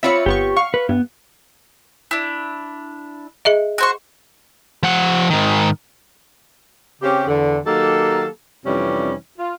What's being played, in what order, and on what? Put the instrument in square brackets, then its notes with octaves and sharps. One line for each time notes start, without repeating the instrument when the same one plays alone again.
[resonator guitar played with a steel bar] C4 F4 C#5 [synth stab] E5 B5 C#7
[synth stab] G1 B3 C#6 [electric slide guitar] G4
[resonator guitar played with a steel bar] F5 [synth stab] C#6
[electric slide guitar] B4
[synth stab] G2 [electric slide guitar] B3
[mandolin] D4 E4
[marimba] G#4 D#5 E5
[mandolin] F#4 C5 C#6
[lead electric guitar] F3 F#5
G#2 D#3
[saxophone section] C#3 C4 C#4 G4
E2 D3
D#3 F#3 A#3 G4 A4
F2 C3 E3 G3 C#4 D4
F4